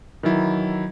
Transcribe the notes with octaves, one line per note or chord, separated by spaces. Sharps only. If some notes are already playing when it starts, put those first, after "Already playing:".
D#3 E3 F#3 E4